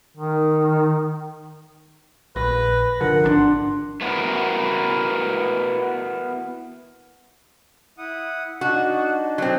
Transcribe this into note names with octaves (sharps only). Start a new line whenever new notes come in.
D#3
A#1 B4 A#6
D3 F3 A#4 F#5
G#1 B2 D4 C6
A3 B3 E4 F#4 A#4
E4 F#5 D#6
D4 D#4 F#4
F#3 C4